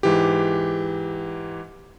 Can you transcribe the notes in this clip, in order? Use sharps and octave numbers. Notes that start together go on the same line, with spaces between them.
G#2 E3 G4